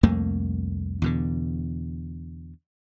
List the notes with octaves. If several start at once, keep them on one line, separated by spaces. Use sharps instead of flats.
C2 F2 A3 A#3
E2 B2 D3